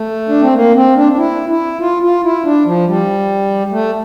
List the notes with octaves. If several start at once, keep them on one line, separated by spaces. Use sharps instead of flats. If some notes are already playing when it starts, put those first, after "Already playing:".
Already playing: A3
D4
C4
A#3
C4
D4
D4
E4
E4
F4
F4
E4
D4
F3
G3
A3